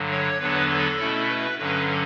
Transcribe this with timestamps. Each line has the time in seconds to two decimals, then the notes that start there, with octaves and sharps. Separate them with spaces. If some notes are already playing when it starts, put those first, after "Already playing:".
Already playing: G2 D3 F#3
0.11 C#5
0.40 E2 D3 F#3 B3 D4 B4
0.69 A4
0.99 B2 A3 C#4 E4
1.28 B4
1.58 G2 D3 F#3 C#4 B4